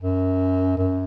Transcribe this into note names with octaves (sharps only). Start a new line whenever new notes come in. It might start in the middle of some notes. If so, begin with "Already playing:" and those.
F#2
F#2